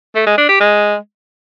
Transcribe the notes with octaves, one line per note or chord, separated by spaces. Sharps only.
A3
G#3
D4
G4
G#3